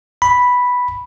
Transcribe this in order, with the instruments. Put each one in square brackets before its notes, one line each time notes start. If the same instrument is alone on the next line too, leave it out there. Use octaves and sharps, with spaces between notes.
[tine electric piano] B5